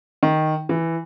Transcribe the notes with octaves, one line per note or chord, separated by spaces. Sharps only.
D#3
E3